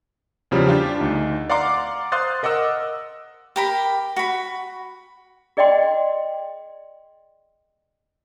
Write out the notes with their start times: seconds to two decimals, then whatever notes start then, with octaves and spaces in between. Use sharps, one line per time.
0.51 E2 C#3 F3 G3
0.67 D4 F4 G4
1.00 D2 D#4
1.50 D5 F5 F#5 A#5 C6 D6
2.12 C5 F5 C6 D#6 F#6 A6
2.43 A#4 D#5 F#5 D6 E6
3.56 G4 A#4 B5
4.16 F#4 B5
5.57 G#4 D5 D#5 F#5 G5 C6